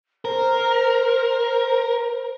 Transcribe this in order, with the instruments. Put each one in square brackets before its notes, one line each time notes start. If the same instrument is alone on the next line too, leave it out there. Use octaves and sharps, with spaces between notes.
[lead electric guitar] A#4 [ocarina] C5